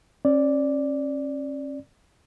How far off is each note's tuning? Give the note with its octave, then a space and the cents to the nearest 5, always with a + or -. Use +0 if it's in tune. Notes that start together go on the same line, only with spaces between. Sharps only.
C#4 -35 D5 +0